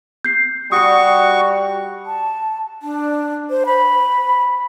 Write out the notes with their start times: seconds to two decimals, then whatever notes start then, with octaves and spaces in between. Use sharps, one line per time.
0.24 G6 C7
0.72 G3 F#4 C#6 D#6 C#7
2.06 A5
2.82 D4
3.50 C5
3.66 B5